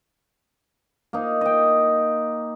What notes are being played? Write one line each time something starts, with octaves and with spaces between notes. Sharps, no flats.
A#3 D#4
D#5 G5